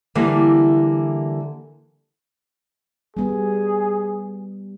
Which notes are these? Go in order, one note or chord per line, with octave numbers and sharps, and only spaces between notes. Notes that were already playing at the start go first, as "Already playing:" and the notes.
D3 E3 G3 A#3
G3 B3 G#4